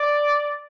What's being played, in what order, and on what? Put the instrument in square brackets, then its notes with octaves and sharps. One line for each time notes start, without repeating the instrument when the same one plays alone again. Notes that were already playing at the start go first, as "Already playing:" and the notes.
Already playing: [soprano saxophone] D5